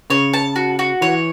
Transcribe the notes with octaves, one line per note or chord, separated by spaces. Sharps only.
C#3 C#5
A5
F#4
F#4
E3 C#5